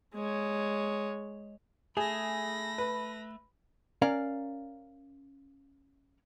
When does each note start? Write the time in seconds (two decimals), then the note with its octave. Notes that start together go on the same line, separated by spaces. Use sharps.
0.15 G#3 C#5
1.97 A3 G#4 B5 A#6
2.78 B4
4.02 C#4 A#4 D5 F5 A#5